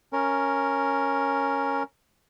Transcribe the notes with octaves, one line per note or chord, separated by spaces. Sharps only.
C#4 A#4